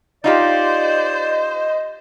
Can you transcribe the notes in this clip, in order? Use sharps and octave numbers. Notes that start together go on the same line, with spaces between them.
D#4 F4 G4 C5 D5 D#5